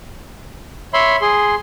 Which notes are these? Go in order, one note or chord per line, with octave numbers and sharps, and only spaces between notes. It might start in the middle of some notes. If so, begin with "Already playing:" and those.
C#5 E5 B5 C6
G#4 C6